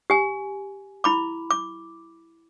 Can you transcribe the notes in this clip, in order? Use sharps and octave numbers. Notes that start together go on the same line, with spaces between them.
G4 G#5
E4 B5 D6
D6